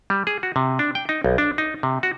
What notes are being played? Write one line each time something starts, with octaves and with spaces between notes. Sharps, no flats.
G3
G#4
F#4
C3
D4
G5
D#4
B1
D4
D#4
C3
F#4